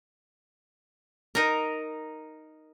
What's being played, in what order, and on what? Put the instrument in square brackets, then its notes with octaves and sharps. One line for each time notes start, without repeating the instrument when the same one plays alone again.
[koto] D#4 A#4